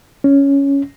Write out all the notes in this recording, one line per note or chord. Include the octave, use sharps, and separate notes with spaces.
C#4